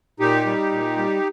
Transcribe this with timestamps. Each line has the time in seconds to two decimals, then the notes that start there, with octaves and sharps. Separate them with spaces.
0.20 A#2 D#4 G4
0.46 G3
0.72 A#2
0.97 G3